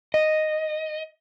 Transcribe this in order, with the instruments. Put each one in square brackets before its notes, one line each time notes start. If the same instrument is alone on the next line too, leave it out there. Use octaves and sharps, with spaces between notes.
[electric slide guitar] D#5